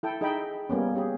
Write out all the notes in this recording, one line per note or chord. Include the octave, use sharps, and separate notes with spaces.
E4 A4 G5
D#4 G#4 D#5 E5 G5 B5
G3 A#3 B3 C#4
C#4 G4 G#4